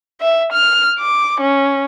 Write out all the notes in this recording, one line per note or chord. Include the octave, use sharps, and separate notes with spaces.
E5
F6
D6
C#4